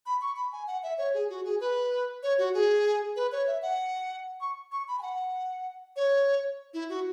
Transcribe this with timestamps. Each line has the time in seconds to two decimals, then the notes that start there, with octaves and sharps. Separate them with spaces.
0.06 B5
0.21 C#6
0.36 B5
0.52 G#5
0.67 F#5
0.83 E5
0.98 C#5
1.14 G#4
1.30 F#4
1.45 G#4
1.61 B4
2.23 C#5
2.38 F#4
2.54 G#4
3.16 B4
3.32 C#5
3.47 E5
3.62 F#5
4.41 C#6
4.72 C#6
4.88 B5
4.99 G#5
5.02 F#5
5.96 C#5
6.74 E4
6.89 F#4